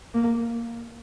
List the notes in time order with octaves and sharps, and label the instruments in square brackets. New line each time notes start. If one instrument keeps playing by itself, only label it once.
[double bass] A#3